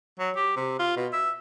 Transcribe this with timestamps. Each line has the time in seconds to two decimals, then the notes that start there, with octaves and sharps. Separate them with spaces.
0.19 F#3
0.36 G4
0.56 C3
0.79 F4
0.96 B2
1.13 E5